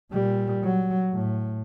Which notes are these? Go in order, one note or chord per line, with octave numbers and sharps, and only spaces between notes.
A#2 G3
F#3
A2